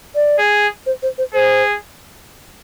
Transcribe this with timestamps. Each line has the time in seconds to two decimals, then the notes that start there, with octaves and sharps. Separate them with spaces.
0.15 D5
0.38 G#4
0.86 C5
1.03 C5
1.18 C5
1.34 G#4 C5